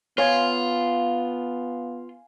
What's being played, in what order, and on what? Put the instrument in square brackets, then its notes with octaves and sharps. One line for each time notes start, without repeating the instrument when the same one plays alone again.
[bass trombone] B3 [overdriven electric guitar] F4 [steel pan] C#5 [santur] F5 G#5